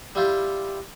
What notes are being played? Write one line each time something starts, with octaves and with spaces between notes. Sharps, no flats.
G3 E4 F4 G4